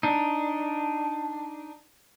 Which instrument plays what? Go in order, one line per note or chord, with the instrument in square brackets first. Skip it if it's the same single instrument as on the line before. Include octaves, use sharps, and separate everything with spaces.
[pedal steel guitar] D4 D#4